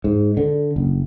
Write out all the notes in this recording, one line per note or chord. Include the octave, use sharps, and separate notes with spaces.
G#2
D3
F#1